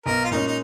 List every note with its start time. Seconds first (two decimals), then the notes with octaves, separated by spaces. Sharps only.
0.06 B1 A#4
0.24 F4
0.31 A#2 G#3 C#4 D#4
0.47 D#4